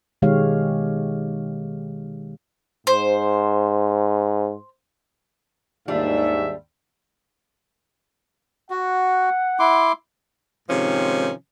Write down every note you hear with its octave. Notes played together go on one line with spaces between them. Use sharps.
B2 D#3 G#3 G4 C#5 F5
G#2 C5
D#2 G#2 G3 D4 F4 E5
F#4 F#5
E4 C6 D6
G#2 C3 D#3 F3 C#4